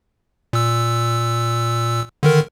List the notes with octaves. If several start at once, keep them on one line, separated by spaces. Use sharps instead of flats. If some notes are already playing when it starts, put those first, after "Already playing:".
A#2 E6
D3 D#3 A#4